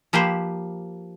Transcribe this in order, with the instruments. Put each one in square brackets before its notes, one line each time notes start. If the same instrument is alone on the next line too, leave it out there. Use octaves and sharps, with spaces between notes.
[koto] F3 A#3 G4 B4 C5